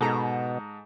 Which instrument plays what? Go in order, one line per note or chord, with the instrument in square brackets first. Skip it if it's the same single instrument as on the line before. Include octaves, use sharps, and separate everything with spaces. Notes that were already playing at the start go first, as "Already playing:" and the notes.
[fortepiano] G#2 A4 A#5 [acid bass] B2